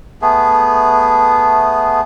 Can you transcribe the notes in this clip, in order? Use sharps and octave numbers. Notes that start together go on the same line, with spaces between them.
A3 B3 G#4